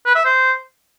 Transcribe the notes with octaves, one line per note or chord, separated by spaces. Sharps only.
B4
E5
C5